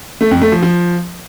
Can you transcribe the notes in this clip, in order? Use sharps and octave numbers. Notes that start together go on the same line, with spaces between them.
A3
F2
A3
F3
F3